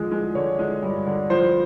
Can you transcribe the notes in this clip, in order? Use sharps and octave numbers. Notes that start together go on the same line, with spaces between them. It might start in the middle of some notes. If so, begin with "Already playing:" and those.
Already playing: D3 F3 G#3
G#3
D3 C#5
G#3
G2
D3
F3 C5